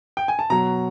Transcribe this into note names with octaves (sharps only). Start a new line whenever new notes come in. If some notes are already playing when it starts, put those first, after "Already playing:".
G5
G#5
A5
B2 F#3 A#5